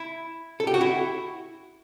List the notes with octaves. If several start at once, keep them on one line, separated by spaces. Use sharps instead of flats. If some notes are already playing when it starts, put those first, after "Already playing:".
Already playing: E4
A4
G4
F#4
E4